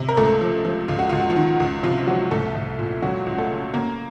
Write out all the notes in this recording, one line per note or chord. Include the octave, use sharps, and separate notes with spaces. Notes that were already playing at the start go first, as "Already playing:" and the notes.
Already playing: C3
A#4
C#2 A3 A4
F3
F3
C#2 F4
F#4
C#2 F4
F#4
F3 F4
D#3
C#2
C3 F3 F4
F4
F3 F#3 F#4
C2 A3 A4
C2
A#2
C#2 F#3 F#4
C#2
A3 A4
C#3
C#3 A#3 A#4